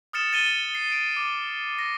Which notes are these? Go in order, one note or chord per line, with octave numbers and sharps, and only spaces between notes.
D#6 F6 A6 C#7 E7
A6 D#7 G7
C7
D7
D6
A#6